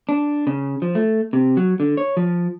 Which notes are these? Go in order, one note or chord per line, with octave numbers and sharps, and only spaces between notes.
D4
C#3
F3
A3
C3
F#3
D3
C#5
F3